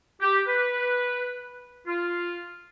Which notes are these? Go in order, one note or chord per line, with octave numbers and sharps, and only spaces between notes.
G4
B4
F4